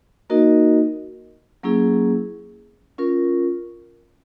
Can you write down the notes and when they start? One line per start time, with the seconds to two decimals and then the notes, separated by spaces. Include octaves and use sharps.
0.30 A#3 D#4 F#4 A#4 D#5
1.63 F#3 A#3 C#4 E4 G#4
2.98 C#4 F4 A#4